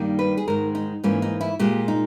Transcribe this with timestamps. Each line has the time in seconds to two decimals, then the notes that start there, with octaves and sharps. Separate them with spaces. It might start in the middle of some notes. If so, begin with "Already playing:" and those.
Already playing: G2 D#3 G3 A#3
0.19 B4
0.37 G#4
0.48 G#2 D#3 G#3 A#4
0.75 D#4
1.04 G#2 E3 A#3 C#4
1.22 D#4
1.41 E4
1.59 A#2 G#3 G4
1.88 D#4